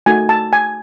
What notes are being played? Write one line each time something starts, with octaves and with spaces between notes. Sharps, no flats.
A3 D#4 F#4 G#5
A5
G#5